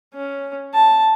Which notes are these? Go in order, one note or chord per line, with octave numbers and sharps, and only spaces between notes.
C#4
A5